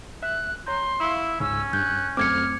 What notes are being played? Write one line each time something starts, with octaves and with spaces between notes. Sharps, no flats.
E5 E6 F#6
C#5 A#5 C6 G6
E4 F5 C#6 E6
C#2 G#2 C#4 E6
G2 F#6 G6
F#2 A3 C4 D6 F6 G#6 C#7